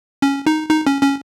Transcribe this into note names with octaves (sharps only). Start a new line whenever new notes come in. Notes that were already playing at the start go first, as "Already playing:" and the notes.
C#4
D#4
D#4
C#4
C#4